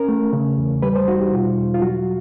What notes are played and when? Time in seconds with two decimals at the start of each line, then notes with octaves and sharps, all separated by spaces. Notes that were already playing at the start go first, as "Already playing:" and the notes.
Already playing: C#4 A#4
0.08 A3
0.33 C#3
0.58 E2
0.82 G3 B4
0.96 C5
1.08 D#4 F#4
1.20 G4
1.32 B2 F4
1.57 E2
1.74 F4
1.82 F#3 F#4